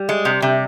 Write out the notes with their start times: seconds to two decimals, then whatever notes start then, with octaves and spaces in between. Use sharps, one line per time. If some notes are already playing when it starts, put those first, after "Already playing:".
Already playing: G3
0.09 G#3
0.25 C3
0.42 C3